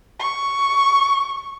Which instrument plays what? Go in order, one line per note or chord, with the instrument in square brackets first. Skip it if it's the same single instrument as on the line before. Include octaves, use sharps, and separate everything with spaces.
[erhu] C#6